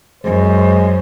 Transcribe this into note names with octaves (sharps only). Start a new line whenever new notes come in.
F#2 G#3 C5